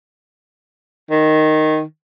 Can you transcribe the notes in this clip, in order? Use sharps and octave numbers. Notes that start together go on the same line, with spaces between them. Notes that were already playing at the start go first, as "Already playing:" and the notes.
D#3